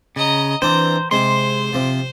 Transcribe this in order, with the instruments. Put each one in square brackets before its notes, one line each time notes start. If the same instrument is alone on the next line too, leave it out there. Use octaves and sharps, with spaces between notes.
[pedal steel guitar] C#3 [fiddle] D#5 A#5
[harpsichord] E3 C4 D4 [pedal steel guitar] C5 [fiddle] A#5
[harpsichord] C3 G#3 [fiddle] C5 [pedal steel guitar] C6
[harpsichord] C3 F3